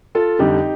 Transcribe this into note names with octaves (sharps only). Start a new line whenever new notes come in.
F4 A4
F1 F2 D3 G3 D#4 G4